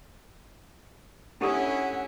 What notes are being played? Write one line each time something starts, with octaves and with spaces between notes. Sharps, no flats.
C#4 D4 E4 G4 A4 F#5